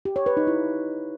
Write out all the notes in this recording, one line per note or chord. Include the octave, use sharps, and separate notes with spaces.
G4
C#5
B4
D#4
E4